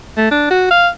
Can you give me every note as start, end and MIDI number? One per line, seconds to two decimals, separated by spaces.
0.17 0.30 57
0.31 0.46 62
0.50 0.68 66
0.71 0.89 77